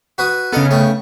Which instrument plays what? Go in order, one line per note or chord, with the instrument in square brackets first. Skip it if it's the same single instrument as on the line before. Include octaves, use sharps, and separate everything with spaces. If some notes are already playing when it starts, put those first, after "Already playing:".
[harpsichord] F#4 B4 D#6
[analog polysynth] C#3 B3 [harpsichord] A4 A#4 D#5
[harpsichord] A3 C#4 G5